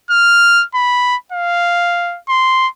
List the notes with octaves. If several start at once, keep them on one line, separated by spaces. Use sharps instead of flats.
F6
B5
F5
C6